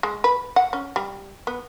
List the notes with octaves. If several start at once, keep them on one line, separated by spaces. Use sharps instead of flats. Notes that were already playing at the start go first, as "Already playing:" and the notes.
G#3
B4
F#5
C#4
G3
B3